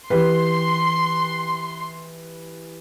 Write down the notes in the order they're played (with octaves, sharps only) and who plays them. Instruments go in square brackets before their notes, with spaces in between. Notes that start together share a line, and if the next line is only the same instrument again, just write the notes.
[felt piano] E3 G4 B4 [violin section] C6